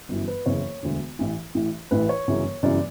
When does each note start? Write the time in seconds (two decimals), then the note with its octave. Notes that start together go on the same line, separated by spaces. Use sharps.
0.09 G1 F#2 E3
0.28 B4
0.46 F#1 E2 C#3 E3 C#5
0.83 E1 D2 D3
1.19 A1 A2 E3
1.54 A1 A2 E3
1.91 A1 A2 E3 B4
2.09 C#5
2.28 G1 F#2 C#3 E3
2.63 G1 F#2 C#3 E3 D5